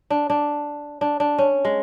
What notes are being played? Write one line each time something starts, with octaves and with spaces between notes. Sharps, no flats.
D4
D4
D4
D4
C#4
G#3